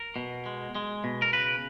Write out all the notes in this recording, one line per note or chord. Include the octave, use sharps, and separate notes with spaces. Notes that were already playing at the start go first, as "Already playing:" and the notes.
Already playing: A#4
B2
G#3
G#3
B2
A#4
C#3 B4